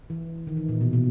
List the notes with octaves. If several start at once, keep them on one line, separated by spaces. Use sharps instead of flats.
E3
D#3
E3
A#2
B2
B2